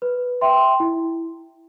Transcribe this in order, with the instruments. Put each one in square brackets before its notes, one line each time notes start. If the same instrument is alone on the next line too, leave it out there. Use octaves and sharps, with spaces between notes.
[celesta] B4
E5 G5 C6
E4